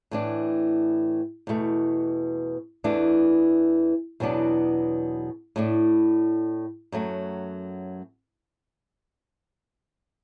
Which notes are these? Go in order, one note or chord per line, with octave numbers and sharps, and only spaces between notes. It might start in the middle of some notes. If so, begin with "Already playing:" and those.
A2 E3 D4
E2 B2 A3
E2 E3 A3 D4
E2 B2 F#3 B3 D4
A2 A3 D4
F#2 F#3 A3